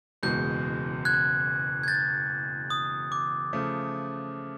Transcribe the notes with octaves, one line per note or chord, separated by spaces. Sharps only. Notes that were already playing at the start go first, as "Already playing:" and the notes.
F#1 E2 B2 G#3 G6
F#6 G#6
G#6
G6 A6
D#6
D6
C#3 F3 A3